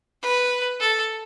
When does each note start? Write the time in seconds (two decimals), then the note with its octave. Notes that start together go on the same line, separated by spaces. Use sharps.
0.22 B4
0.80 A4